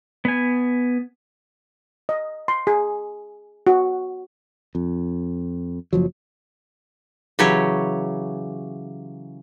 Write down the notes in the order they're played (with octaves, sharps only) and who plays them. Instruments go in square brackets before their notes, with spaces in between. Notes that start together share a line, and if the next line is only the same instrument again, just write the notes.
[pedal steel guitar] B3 G#5
[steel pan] D#5
C6
G#4
F#4
[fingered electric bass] F2
F#1 F3 F#3
[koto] C#3 E3 F#3 G4 C#5